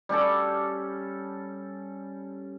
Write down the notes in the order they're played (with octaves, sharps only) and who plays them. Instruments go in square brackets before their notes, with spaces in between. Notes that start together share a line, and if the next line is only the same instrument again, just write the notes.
[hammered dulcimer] G3 C#4 G4 A4